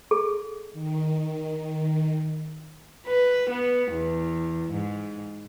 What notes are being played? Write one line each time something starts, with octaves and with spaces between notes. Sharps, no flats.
G#4 A4
D#3
B4
B3
E2
G#2